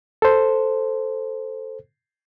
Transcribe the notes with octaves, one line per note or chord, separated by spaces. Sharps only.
A4 C5